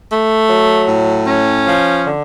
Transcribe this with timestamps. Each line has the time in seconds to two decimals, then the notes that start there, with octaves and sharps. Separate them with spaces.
0.10 A3
0.49 F#3
0.88 A2
1.27 C#4
1.65 F3
2.04 D3